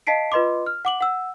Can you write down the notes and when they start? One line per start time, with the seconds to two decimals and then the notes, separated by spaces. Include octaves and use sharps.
0.07 D#5 F5 A5 B6 C7 D7
0.32 F4 B4 D#5 C6 D6
0.66 F6
0.85 F#5 D6 F#7
1.01 F#5 E6